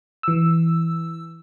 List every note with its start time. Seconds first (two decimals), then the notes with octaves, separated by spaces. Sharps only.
0.23 E3 E6